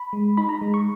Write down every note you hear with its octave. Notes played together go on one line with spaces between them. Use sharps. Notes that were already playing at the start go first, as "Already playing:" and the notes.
Already playing: B5
G#3
D#4 B5
A#5
G#3
C#6